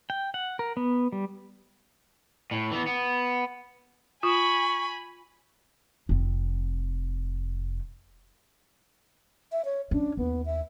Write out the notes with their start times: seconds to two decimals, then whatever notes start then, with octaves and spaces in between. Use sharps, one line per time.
0.10 G5
0.34 F#5
0.59 A#4
0.77 B3
1.12 G3
2.51 A2
2.72 E3 B3
2.86 B3
4.23 F4 G#5 B5 C#6
6.09 F1 C4
9.52 E5
9.65 C#5
9.91 C#4 D4
10.17 D#2 B3
10.46 E5